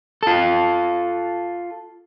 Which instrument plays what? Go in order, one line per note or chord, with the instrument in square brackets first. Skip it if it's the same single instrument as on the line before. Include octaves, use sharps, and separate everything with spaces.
[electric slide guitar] F4 A4